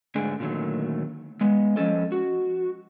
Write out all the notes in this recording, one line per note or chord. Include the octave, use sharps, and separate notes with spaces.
G#2 D3 A3 D4 G#4
A#2 D3 D#3 F#3 A3
G#3 B3
F3 G3 C#4 A4 D#5
F#4